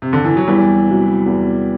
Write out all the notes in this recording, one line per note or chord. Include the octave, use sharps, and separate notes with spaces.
C3
D3
E3
F#3
E2 E3 G3
C3 F#3
E2